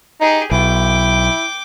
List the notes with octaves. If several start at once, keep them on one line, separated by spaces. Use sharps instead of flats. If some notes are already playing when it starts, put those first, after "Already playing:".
D#4 G4 G#4
B1 E4 G5 D6